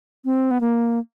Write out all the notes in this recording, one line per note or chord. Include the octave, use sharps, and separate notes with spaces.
C4
B3
A#3